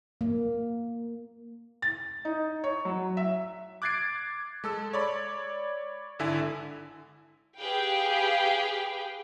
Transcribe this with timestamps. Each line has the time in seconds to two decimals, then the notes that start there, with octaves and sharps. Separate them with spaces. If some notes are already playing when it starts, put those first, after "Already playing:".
0.21 A#3
1.82 A6
2.25 D#4
2.64 C#5
2.85 F#3
3.17 E5
3.82 D6 F#6 G#6 A6 C7 D7
4.64 G#3 A4 E6
4.93 C#5 D5 B5
6.19 G#1 D3 E4 E5 G#5
7.58 G4 G#4 B4 F5 G5